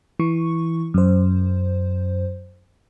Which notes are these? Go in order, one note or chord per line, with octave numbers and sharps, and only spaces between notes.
E3 C#6
F#2 C5